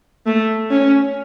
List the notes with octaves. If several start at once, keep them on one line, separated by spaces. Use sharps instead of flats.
A3
C#4